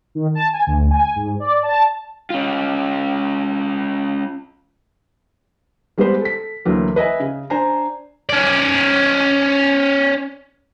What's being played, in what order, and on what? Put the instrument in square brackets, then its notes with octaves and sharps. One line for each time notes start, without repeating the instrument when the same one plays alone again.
[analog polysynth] D#3
A5
G#5
D2
G#5
G#2
D5
A5
[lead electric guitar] C#4 F4
[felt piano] G3 G#3 B3 G4 B4 C5
A4 B6
D2 E3 F#3 A#3
B4 D#5 E5 G#5
C#3
D4 C5 G#5 A#5
[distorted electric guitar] C#4 D5